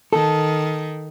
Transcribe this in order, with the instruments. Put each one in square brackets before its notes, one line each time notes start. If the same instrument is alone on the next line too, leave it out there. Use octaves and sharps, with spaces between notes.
[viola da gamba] D#3 [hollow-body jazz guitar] A4